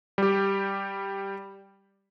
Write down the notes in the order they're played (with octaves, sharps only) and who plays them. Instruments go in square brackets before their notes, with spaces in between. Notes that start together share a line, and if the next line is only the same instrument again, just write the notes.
[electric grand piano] G3 G4